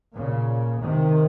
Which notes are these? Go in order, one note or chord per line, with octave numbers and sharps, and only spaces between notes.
A#2 C#3
C3 D#3